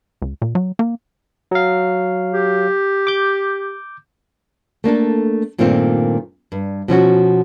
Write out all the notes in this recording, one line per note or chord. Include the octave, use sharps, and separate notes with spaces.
C#2
A#2
F#3
A#3
F#3 F5
G4
D6 G6
A3 A#3 D4 A4
G2 A#2 D#3 A3 C4 F4
G2
B2 F3 C#4 F#4